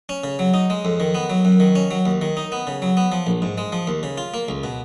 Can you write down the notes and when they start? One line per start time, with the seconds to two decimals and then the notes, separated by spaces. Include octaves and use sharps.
0.09 C#4
0.24 C#3
0.39 F#3
0.54 D#4
0.70 G#3
0.85 F2
1.00 D#3
1.15 B3
1.30 F#3
1.45 F#2
1.60 D#3
1.75 C#4
1.91 F#3
2.06 D#2
2.22 D#3
2.37 D#4
2.52 B3
2.67 C#3
2.82 F#3
2.97 B3
3.12 F3
3.27 A#1
3.42 G#2
3.58 G#3
3.72 F3
3.87 D#2
4.03 C#3
4.18 F4
4.34 A#3
4.49 C#2
4.64 B2